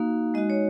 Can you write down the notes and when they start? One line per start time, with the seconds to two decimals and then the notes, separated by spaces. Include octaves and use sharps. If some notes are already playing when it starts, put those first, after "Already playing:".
Already playing: A#3 D#4 F#4 F5
0.34 G#3 D#4 F#4 D#5
0.50 C#5